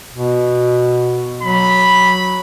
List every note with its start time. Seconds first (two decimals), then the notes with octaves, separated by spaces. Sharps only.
0.13 B2
1.43 F#3 B5